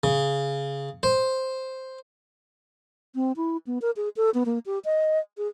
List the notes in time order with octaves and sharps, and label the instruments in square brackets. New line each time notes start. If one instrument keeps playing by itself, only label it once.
[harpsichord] C#3
C5
[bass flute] C4
E4
B3
A#4
G#4
A4
B3
A#3
G4
D#5
G#4